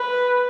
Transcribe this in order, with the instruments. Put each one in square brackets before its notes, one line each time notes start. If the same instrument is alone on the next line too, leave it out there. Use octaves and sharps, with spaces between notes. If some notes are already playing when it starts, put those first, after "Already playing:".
Already playing: [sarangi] B4